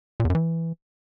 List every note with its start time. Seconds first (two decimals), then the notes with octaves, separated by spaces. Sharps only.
0.20 A#2
0.25 E2
0.30 F#2
0.35 E3